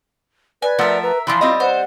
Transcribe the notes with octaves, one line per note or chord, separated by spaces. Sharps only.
B4 D5 G#5
F3 A3 A#4 E5 F#5
B4 A#5
E3 F3 E4 F4 D5 B5 C6
G3 C4 D#5
C5 F#5